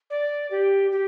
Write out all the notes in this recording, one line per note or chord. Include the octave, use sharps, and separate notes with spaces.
D5
G4
G4